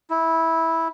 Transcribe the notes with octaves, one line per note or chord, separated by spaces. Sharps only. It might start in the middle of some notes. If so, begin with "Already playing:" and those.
E4